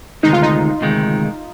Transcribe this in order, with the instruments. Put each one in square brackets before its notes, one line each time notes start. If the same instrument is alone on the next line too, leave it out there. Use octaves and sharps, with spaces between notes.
[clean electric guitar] D2 C3 D#3 G#3 [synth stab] D#4
[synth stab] F4
D#4
[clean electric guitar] D2 C3 D#3 G#3